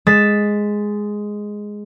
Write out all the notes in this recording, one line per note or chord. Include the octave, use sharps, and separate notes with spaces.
G#3 A6 B6 E7